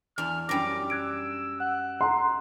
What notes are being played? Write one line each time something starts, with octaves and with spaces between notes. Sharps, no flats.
E2 D4 F6
F#2 G3 D4 D6 A#6
E6 F#6 G#6 D7
F#5 F#6
F#5 A#5 C6